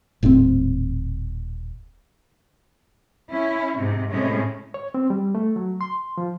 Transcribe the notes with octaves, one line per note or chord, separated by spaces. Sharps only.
D#1 A2 B3 C4
C#4 E4
G#2 C3
A2 C3 G#3 A3 C#4
C#5
C4
G3
A3
F#3
C6
F3